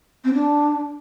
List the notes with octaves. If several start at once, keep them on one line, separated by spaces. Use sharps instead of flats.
C4
D4